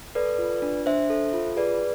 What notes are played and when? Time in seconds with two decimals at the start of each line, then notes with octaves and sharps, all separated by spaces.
0.15 A4 B4 D5
0.39 F4
0.62 D4
0.86 D4 C5 E5
1.10 A4
1.33 F4
1.56 G#4 B4 D5